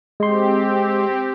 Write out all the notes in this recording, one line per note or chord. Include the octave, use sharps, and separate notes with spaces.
G#3 C4 G4 C6